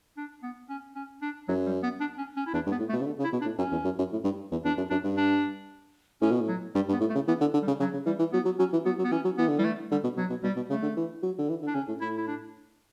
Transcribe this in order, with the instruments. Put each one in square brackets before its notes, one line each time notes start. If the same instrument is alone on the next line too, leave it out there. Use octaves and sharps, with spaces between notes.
[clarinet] D4
B3
C#4
C#4
D4
[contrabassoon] F#2 [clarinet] F#3
[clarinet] G3
B3
D4
C#4
C#4
E4
[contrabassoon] E2 [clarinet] D4
[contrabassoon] G2
[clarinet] B3
[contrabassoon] A2
[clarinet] A3
[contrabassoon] B2
C#3
D3
C#3
[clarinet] E4
[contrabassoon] B2
[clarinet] D4
[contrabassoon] A2
[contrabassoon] F#2 [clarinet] C#4
[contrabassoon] E2
F#2
F#2
A2
G2
E2
[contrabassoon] E2 [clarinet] D4
[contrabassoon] F#2
[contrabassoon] F#2 [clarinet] D4
[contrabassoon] G2
[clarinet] D4
[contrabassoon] A2 [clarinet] C#4
[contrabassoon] B2
A2
[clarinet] F#3
[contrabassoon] G2 [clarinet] G3
[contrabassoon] G2
[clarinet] B3
[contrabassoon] A2
[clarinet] A3
[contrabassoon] C#3
[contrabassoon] E3 [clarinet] B3
[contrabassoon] D3
D3
[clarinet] G3
[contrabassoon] C#3
[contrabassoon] C#3 [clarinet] F#3
[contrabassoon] C#3
[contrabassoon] E3 [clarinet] G3
[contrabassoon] E3
[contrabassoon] F#3 [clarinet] B3
[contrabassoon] F#3
[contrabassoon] F#3 [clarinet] C#4
[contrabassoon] E3
[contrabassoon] F#3 [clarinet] B3
[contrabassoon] F#3
[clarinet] B3
[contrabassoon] E3 [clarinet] C#4
[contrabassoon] F#3
[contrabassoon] E3 [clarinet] B3
[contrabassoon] D3
[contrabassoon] E3 [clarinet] G3
[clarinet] A3
[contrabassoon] D3 [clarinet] G3
[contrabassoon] B2
[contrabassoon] B2 [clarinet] F#3
[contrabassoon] B2
[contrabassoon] B2 [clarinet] G3
[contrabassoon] B2
[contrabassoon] C#3 [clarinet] A3
[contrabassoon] D3
E3
F#3
D3
E3
D3
[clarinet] D4
[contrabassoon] C#3 [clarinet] C#4
[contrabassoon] A2
[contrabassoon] A2 [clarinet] E4
[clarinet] E4
D4